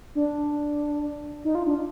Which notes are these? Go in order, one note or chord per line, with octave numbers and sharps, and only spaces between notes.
D4
D#4
F4
D4